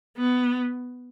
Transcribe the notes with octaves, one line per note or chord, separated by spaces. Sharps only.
B3